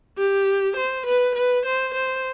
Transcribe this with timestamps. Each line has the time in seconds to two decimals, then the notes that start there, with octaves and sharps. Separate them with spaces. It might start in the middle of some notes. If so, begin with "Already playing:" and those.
0.18 G4
0.76 C5
1.06 B4
1.35 B4
1.65 C5
1.94 C5